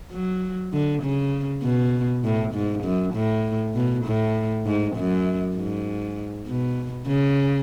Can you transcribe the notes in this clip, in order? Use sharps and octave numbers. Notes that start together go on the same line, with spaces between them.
F#3
D3
C#3
B2
A2
G#2
F#2
A2
B2
A2
G#2
F#2
G#2
B2
C#3